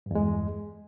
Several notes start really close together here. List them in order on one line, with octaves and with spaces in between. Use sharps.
G2 E2 G#3